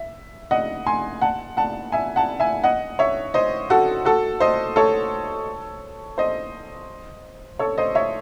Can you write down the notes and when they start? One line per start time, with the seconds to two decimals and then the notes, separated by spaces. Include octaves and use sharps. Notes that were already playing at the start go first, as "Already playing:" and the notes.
Already playing: E5
0.51 D#5 F#5
0.86 G#5 C6
1.21 F#5 A5
1.57 F#5 A5
1.92 E5 G#5
2.16 F#5 A5
2.40 E5 G#5
2.64 D#5 F#5
2.99 C#5 E5
3.34 C5 D#5
3.70 F#4 A4
4.05 F#4 A4
4.40 C5 D#5
4.76 A4 C#5
6.18 C5 D#5
7.59 A4 C#5
7.78 C5 D#5
7.95 C#5 E5